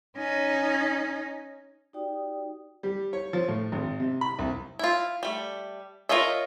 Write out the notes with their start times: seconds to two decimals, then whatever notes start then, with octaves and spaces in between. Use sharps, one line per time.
0.16 C#4 D#4
1.93 D#4 F#4 G4 D5 G5 D#6
2.83 G3
3.13 C#5
3.33 F3
3.48 A2
3.72 G#1
4.00 C3
4.21 B5
4.39 C2
4.79 E4 F4
5.23 G3 A3
6.09 F4 A#4 C#5 D#5 E5